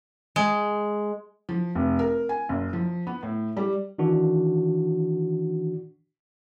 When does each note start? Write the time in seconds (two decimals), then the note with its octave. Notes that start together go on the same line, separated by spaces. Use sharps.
0.36 G#3
1.49 F3
1.75 F1
1.99 A#4
2.29 G#5
2.49 F#1
2.73 F3
3.07 B3
3.23 A2
3.57 G3
3.98 D#3 E3 D4 F#4